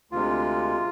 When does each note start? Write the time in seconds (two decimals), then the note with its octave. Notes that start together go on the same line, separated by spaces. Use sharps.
0.11 D2 C3 G#3 F4